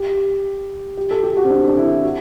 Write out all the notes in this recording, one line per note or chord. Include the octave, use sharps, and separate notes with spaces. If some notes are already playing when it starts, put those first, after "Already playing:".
Already playing: G4
G4
A4
G4
F#4
C4
D4
D4
E4
F#4